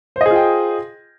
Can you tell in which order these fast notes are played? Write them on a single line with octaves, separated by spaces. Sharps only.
C5 D#5 G#4 F4 G5